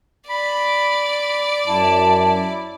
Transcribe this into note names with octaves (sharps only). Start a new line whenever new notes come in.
D5 B5
F#2 E4 A5